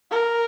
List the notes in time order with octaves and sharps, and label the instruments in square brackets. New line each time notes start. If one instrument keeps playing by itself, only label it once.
[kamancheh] A#4